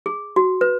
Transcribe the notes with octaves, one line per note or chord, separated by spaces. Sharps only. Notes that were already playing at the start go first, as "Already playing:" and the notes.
G#4
F#4
B4